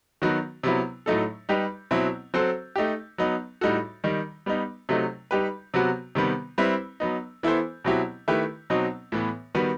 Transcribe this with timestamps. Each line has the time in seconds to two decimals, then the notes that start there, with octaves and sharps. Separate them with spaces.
0.22 D#3 F#3 B3 D#4 F#4
0.63 C3 F#3 B3 E4
1.06 A2 F#3 A3 D#4 A4
1.49 G3 D#4 G4 B4
1.91 B2 F#3 C4 E4
2.34 F#3 C4 F#4 A4 C5
2.76 A3 D#4 G4
3.18 F#3 B3 D#4
3.61 A2 G3 D#4 F#4 A4
4.04 D#3 G3 D#4
4.46 G3 B3 D#4
4.89 C3 F#3 A3 D#4
5.31 G3 D#4 G4 B4
5.74 C3 F#3 B3 F#4
6.15 C3 D#3 G3 B3
6.58 G3 C4 E4 B4
7.00 F#3 B3 D#4
7.43 E3 B3 E4 A4 C5
7.85 B2 F#3 C4 E4 G4
8.28 D#3 A3 E4 G4 B4
8.70 B2 F#3 C4 D#4
9.12 A2 E3 B3
9.55 D#3 G3 B3 F#4 B4